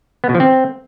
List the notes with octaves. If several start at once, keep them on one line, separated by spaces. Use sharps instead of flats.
B3
B2
F3
C4